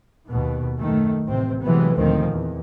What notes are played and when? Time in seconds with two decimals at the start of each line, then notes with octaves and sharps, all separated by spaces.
0.29 D#2 B2
0.78 F#2 D#3 A3
1.28 A1 C3 C4
1.63 C3 E3 F#3 G#3 A3 B3
1.97 D2 A#2 D#3 F3 C4
2.29 E2